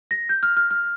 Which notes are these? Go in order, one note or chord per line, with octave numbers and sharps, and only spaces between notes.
A#6
G6
F6
F6
F6